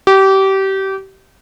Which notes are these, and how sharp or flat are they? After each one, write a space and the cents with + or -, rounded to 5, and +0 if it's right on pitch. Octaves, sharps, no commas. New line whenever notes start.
G4 -25